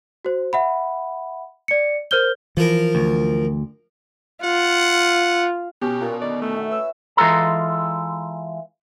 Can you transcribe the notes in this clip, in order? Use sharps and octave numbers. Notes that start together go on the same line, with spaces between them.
F#4 C5
E5 F#5 B5
D5 C#7
A#4 C5 F6 G6 G7
E3 F3 A#4
D2
F4 F#5
B2 C#4 G4
A#2
D3 D#3 D5
A3
F#4 E5
B4 C#5 E6
E3 G#3 F4 A4 A#5